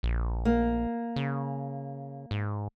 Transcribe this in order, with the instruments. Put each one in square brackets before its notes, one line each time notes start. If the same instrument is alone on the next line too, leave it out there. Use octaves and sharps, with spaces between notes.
[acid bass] A#1
[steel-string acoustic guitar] A#3
[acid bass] C#3
G#2